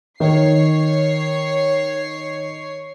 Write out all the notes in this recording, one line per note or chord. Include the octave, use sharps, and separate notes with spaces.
D#3 C#5 C7